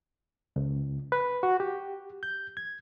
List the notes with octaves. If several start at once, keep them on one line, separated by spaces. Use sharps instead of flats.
C#2
B4
F#4
G4
G6
G#6